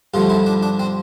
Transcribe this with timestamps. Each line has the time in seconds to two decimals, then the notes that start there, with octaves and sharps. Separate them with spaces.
0.14 G2 D3 F3 A3 F4
0.30 E4
0.46 D4
0.63 D4
0.79 C4